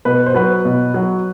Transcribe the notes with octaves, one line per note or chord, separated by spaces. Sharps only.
B2 B4
C5
F#3 B4
B2
F#3